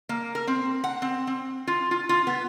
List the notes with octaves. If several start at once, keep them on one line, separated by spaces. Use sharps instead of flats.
A#3
A#4
C4
F#5
C4
C4
F4
F4
F4
B3